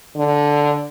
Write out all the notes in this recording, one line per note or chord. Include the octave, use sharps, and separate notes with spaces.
D3